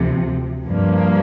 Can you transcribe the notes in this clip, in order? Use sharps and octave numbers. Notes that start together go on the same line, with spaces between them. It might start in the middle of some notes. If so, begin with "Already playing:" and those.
Already playing: D2 C3 F3
G2 F3 A#3